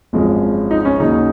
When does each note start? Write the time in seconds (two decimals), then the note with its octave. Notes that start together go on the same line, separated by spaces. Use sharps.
0.13 G#1 F#2 F3 G#3
0.71 D#4
0.85 C#4
0.99 D#2 C#3 F#3 D#4